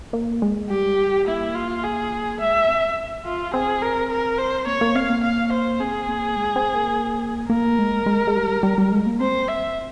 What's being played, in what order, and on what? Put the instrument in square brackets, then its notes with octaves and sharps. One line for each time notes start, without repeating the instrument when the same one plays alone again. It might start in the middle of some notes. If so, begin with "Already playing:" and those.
[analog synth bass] A#3
G#3
[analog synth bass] G3 [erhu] G4
[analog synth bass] A#3 [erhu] E4
[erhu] F4
G#4
[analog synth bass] G#3 [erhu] E5
[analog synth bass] C4
[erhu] F4
[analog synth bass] C4 [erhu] G#4
[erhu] A#4
A#4
C5
[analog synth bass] A#3 [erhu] C#5
[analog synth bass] A#3
[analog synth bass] C4 [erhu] F5
[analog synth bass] A#3
[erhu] F5
C5
[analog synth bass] C4 [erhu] G#4
[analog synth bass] A#3
G#3
C4
A#3
[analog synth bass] A#3 [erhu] A#4
[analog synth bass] G#3
G#3
G#3
G3
G3
G3
G#3
A#3
[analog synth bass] C4 [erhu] C5
[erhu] E5